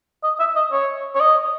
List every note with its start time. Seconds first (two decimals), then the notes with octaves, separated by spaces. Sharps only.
0.24 D#5
0.40 E5
0.56 D#5
0.72 C#5
1.15 C#5
1.20 D#5